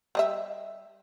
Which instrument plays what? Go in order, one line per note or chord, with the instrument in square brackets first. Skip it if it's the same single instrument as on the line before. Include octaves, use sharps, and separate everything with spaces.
[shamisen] G3 D#5 E5